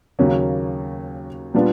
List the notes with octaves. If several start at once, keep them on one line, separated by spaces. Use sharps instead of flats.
D#2 C#3 F#3 A#3 C#4
A#2 G3 B3 D4 F4